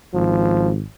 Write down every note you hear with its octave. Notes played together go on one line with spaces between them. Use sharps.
G#1 F3